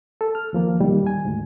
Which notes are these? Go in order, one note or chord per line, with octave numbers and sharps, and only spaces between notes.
A4
F6
D#2 F3 A#3
A#2 D#3 G3
D#2 G#5
D2 G#2